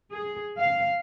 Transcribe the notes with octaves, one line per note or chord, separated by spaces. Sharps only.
G#4
F5